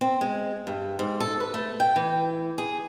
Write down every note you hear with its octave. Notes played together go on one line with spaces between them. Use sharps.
C4
G#3
G2
G#2
A4
B4
A3
G5
E3
G#4